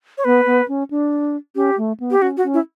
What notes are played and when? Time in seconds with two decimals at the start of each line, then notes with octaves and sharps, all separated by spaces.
0.18 C#5
0.24 B3 B4
0.46 B3
0.68 C#4
0.91 D4
1.55 C#4 G4
1.77 A3
2.00 B3
2.11 G4
2.21 C#4 F#4
2.37 F#4
2.44 C#4
2.54 E4